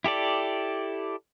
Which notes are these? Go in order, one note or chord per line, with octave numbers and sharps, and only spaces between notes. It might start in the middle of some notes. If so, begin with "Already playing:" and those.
E4 G4 A4 D5